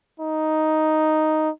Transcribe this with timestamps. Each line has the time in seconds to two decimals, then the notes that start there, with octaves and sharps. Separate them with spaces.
0.20 D#4